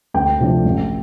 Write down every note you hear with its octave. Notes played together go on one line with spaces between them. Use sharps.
D2 G5
C3 F3 A3 D4
A1